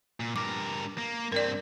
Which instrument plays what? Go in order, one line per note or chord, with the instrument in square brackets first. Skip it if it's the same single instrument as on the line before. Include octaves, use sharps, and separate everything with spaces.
[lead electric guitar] A#2
[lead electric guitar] G2 A#4 [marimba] D6
[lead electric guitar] A#3
[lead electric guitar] G2 C4 [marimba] A#4 D5